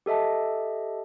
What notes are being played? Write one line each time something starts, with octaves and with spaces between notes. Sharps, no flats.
G4 A4 D#5 E5 A5